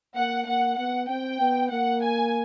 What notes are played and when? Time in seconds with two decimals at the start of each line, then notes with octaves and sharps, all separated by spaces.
0.16 A#3 F#5
0.47 A#3 F#5
0.78 B3 F#5
1.09 C4 G5
1.41 B3
1.72 A#3 F#5
2.03 G#5